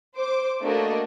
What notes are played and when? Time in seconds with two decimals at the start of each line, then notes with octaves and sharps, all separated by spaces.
0.16 C5 D6
0.62 A3 A#3 D4 F#4 D5 D#5